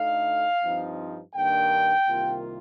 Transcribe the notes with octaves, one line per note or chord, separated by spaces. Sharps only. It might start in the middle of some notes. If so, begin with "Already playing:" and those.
Already playing: D2 D3 A3 D#4 F5
G2 F3 C4 D#4
G2 D#3 A#3 D4 G5
C2 C3 D#3 A#3 F4